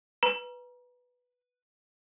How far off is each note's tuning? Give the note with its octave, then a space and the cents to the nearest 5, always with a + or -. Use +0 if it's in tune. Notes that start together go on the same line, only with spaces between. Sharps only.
B4 +0 A#5 +35